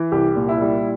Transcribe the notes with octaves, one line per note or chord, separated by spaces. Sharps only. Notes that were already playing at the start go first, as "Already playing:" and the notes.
Already playing: E3
C2 G4
A#2
E4
G3